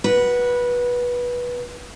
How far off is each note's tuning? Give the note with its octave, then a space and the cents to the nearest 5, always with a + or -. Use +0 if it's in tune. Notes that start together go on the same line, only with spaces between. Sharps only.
F#4 +5 B4 -15